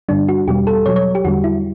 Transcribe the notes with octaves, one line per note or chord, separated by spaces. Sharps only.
G2 D3 G3 D4
F#4
E2 B2 G3 G4
A4
B2 F#3 C#5
C#5
G4
E2 D3 G3 F#4
E4